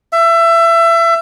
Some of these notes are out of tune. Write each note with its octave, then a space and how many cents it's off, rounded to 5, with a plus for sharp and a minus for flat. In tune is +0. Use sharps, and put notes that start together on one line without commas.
E5 +25